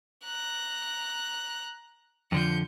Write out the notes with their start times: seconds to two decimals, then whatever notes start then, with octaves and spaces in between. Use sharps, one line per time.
0.24 A#5 F#6
2.32 F2 D3 F3 G6 C#7